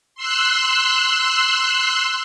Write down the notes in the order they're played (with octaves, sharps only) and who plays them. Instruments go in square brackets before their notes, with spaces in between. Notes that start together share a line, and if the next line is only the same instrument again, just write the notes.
[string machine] C6 E6 F#6